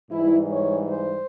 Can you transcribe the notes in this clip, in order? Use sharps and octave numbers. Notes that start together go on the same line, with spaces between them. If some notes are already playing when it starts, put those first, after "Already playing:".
G#2 E3 G3 E4
C#5
C5